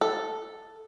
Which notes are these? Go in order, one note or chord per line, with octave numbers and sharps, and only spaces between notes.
A4